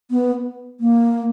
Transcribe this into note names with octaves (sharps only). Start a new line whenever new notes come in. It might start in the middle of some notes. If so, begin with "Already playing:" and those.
B3
A#3